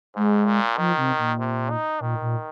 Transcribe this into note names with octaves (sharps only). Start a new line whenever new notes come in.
G#2 G#3
A#2
D#3 F3
C3
A#2
C3
D#4
A#2 D#3
A#2